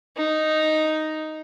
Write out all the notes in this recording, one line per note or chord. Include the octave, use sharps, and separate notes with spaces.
D#4